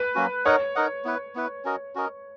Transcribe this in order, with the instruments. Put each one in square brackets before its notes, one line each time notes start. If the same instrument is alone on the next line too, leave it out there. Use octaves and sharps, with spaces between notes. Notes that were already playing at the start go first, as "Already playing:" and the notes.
Already playing: [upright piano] B4
[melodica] F#3 A#3 C#4 F#4
[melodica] D#4 A#4 D#5 F#5 [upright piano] C#5
[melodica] D#4 A#4 D#5 F#5
B3 E4 B4
B3 E4 B4
C#4 F#4 A#4 D#5
C#4 F#4 A#4 D#5